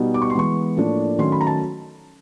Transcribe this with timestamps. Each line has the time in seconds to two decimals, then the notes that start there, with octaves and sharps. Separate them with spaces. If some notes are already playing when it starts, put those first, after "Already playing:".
Already playing: B2 G3 B3 D#4
0.14 D6
0.22 C#6
0.30 C6
0.34 E3 G#3 B3 C#6
0.77 A2 F3 A#3 D4
1.18 D#3 F#3 A3 C#4 C6
1.32 B5
1.41 A#5
1.47 A5